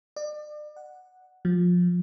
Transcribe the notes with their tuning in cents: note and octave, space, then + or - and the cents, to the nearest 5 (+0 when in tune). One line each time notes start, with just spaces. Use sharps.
D5 +35
F#5 +0
F3 +25